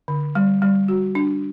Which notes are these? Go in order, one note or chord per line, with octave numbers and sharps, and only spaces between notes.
D3
G3
G3
F#4
D4